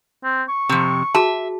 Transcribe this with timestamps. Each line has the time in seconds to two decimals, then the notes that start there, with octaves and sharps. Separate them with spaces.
0.24 C4
0.49 C#6
0.69 F2 C3
1.15 F#4 G#4 E5 A5